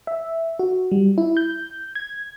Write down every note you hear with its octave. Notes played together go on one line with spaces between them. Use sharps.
E5
F#4
G3
E4
G6
G#6